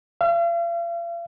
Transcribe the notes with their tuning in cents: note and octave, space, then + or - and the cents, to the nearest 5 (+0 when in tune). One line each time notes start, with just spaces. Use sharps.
F5 -45